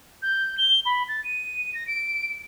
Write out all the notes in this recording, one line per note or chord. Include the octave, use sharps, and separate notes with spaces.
G6
G7
B5
A6
D#7
A#6
D7